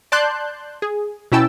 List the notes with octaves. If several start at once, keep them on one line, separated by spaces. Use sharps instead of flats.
D5 A5 C6 F#6 G6
G#4
B2 C#4 E4 G5 A5 E6